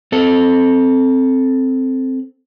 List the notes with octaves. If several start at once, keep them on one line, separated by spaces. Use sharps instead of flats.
C4 A4